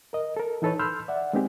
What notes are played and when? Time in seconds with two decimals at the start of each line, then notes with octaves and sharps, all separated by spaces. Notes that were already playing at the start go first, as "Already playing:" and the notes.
0.13 A#4 D#5
0.37 A4 A#4
0.62 E3 D#4 A4 B4 C#5
0.79 B5 C6 E6 F6 G6
1.08 D5 E5 F#5
1.33 G#3 B3 C4 D#4 G4 G#4